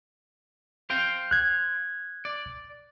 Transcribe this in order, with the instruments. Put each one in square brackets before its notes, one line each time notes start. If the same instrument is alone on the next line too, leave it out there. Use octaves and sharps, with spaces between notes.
[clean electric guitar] C5 F5 G5
[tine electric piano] F#6 G#6
[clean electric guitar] D5